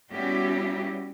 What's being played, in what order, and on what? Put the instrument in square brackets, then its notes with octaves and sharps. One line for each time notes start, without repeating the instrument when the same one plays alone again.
[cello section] G3 B3 C#4 E4 F#4 G4